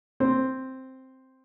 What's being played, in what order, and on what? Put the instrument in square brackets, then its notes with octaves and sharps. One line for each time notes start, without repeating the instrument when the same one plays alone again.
[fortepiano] C4 C5